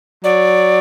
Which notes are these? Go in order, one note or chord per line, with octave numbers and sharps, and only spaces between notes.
F#3 D5